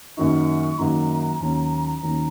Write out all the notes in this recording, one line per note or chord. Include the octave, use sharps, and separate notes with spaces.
F#2 D#3 F#3 A#3 D#4 C#6
F#2 D#3 F#3 A#3 D#4 A#5
D#2 D#3 F#3 C#4
D#2 D#3 F#3 C#4 A#5